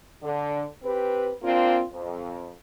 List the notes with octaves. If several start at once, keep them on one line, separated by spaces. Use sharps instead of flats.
D3
C4 G4 B4
A#3 C4 D4 F4
F2